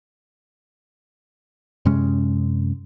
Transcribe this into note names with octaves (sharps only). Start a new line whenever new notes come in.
F#2 C3 G#3 C#4